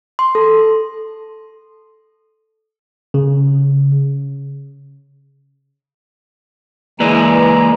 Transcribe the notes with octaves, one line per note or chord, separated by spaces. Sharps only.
C6
A4
C#3
E3 G#3 A#3 B4 D5 A#5